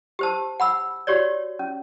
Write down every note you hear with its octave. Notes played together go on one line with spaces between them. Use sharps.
G4 C5 A5
F#5 B5 E6
F#4 G4 C#5 D5
C#4